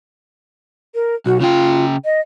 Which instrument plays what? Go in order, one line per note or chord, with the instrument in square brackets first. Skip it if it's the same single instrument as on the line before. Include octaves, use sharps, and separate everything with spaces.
[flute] A#4
[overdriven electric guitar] B1 [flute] F#4
[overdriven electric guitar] C#3 G5 [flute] F4
[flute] D#5